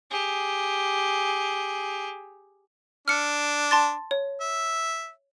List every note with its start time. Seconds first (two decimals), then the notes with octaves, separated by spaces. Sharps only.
0.11 G4 G#4
3.08 D4 F6 C#7
3.71 A5 C6 A6
4.11 C#5
4.41 E5